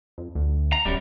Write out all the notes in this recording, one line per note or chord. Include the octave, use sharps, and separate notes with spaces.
F2
D2
A#5
D1 F#2 G3